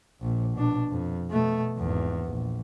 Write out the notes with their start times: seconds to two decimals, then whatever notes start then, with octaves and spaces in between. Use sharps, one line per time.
0.21 A#1
0.53 B2 D4
0.90 F2
1.31 B2 A3
1.77 G#1 E2
2.25 A#1